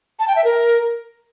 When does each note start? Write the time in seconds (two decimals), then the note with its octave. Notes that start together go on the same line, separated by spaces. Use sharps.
0.19 A5
0.28 G5
0.36 E5
0.44 A#4